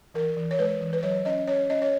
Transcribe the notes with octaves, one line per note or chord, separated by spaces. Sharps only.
E3 A#4
E3
C#5
G#3 B4
E3
B4
F#3 C#5
C#4 D#5
C#4 C#5
C#4 D#5
C#5